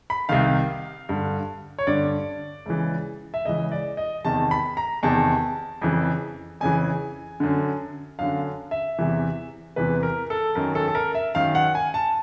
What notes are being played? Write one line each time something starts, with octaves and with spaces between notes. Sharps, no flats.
B5
C2 C3 D#3 F5
G2 D3
C#5
G2 D3 D5
C#2 C#3 E3
E5
C#2 C#3 E3 D#5
D5
D#5
E2 C3 D#3 A5
B5
A#5
E2 C3 D#3 A5
F2 C#3 E3
F2 C#3 E3 G#5
F#2 D3
F#2 D3 F5
E5
E2 C3 E3
E2 C3 E3 B4
A#4
A4
F#2 D#3 A#4
A4
A4
A#4
E5
F#2 D#3 F5
F#5
G#5
A5